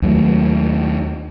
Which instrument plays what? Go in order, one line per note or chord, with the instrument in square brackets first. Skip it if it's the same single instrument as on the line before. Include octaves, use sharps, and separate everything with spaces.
[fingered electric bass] D#2 F#3 A3